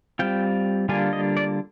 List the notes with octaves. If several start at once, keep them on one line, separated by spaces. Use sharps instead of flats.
G3 C4 F4 G5
D3 G3 A#3 D4 F4 G#5
D#5
D5